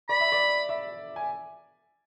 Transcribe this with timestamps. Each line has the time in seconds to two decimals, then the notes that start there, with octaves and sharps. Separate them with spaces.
0.09 D5 B5
0.20 E5
0.32 D5
0.69 E5
1.16 G#5